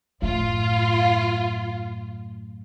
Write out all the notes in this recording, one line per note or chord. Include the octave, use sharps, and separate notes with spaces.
F#2 A2 F4